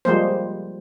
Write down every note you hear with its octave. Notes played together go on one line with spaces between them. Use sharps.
F3 G3 G#3 A#3 C5